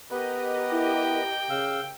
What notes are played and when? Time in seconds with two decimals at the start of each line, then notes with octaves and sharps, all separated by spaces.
0.11 B3 G4 A#4 B4 D#5
0.72 E4 G5
1.50 C#3 F5 E6